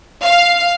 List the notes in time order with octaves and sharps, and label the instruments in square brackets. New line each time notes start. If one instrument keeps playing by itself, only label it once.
[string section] F5